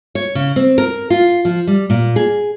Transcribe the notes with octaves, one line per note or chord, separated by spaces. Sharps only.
C#5
C#3
C4
A#4
F4
F3
G3
A#2
G#4